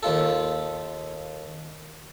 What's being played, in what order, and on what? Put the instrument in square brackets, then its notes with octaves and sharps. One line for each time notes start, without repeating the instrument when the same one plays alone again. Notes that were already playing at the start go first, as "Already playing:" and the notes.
[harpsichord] D#2 F4 A4